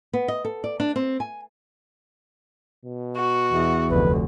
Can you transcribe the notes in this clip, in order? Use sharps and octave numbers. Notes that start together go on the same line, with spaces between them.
B3
D#5
A4
D5
D4
C4
G#5
B2
F#4
E2
F1 D2 B4